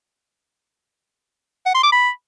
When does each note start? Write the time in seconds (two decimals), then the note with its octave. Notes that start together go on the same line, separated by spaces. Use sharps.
1.66 F#5
1.75 C6
1.83 D6
1.92 B5